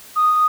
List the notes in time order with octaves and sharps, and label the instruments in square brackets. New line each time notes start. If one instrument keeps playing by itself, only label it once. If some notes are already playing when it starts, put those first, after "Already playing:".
[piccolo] D#6